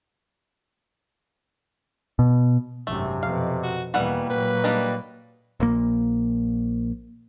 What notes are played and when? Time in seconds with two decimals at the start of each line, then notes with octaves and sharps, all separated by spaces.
2.19 B2
2.87 G#1 F#2 C3 A3
3.23 F2 B2 F5
3.63 F#4
3.94 E2 B2 E3 G3 A#3 B3 F#5
4.30 A#2 F#3 B4
4.64 G3 A#3 D4 D#4
5.60 A#1 A#2 A#3